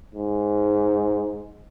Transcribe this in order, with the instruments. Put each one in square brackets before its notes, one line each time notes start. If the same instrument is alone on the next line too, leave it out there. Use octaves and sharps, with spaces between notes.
[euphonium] G#2